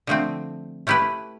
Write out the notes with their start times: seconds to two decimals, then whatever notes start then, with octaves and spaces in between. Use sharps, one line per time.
0.07 D3 F3 A3 C4
0.87 A3 C#4 E4 G4 B4